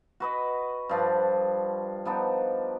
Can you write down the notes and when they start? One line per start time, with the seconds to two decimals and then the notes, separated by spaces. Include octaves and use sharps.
0.20 F#4 B4 D#5
0.89 G2 F3 D4
2.05 F3 B3 D4 D#4